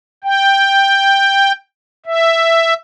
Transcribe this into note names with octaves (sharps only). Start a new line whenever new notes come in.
G5
E5